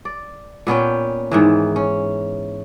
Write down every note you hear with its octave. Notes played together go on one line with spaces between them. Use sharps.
D5
A#2 B3 C#4 G5
G#2 D#3 E3
C#4